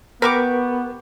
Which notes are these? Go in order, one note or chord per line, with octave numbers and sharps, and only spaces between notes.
B3 G4 A#4 B4 C#6 D6